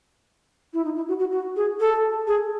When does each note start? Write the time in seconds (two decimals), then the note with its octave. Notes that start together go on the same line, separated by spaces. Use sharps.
0.74 E4
0.84 D#4
0.96 E4
1.08 F#4
1.19 F#4
1.32 F#4
1.56 G#4
1.80 A4
2.27 G#4